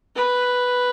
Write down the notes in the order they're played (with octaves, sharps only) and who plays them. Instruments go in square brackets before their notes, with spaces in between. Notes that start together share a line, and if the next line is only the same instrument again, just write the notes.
[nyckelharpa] B4